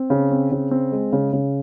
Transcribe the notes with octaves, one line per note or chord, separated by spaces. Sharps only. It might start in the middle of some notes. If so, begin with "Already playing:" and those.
Already playing: C4
C#3
C4
C#3
C4
G#3
C#3
C#3